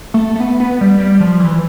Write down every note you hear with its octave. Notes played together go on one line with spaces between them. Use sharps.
A3
A3
B3
B3
G3
G3
F3
E3